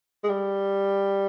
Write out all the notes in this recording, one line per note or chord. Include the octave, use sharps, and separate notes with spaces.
G#3
G3